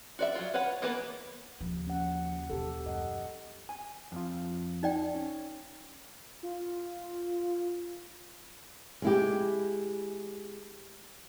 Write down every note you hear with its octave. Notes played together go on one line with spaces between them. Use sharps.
F#4 D5 E5
F#3 F4
B4 C#5 F#5
E3 A#3 B3 B4
D#2 C#3 F3
C#4 F#5
B2 E3 G4 A4
F#2 D#5 F#5
G#5
F2 F4
D#4 D5 G5
C#4
F4
G#3 E4 G4